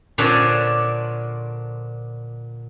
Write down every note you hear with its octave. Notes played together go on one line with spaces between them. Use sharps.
A#2 D3 D4 C5 C#5